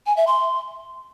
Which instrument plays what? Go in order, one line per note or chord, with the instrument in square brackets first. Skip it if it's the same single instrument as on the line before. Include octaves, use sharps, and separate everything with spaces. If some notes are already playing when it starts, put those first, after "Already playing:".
[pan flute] G#5
E5
C6